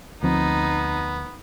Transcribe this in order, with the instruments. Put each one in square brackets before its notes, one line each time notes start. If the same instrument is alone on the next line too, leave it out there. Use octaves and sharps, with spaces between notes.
[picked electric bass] D2 F3 C4 [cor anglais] B3 [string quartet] D#4